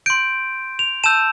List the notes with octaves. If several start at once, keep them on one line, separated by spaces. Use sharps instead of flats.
C6 G6 D7
F7
A5 E6 G6 E7